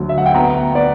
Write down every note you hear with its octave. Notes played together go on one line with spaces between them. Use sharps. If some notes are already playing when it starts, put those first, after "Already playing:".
Already playing: D2 F#3
E5
F#5
G5
B3 F#5 A#5
B3 B4 D5